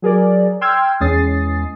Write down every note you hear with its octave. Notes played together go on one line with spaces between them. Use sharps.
F#3 G#4 A#4 D5
G5 C6 E6 F6 G6 G#6
E2 G#3 C#4 D#6 A6 C7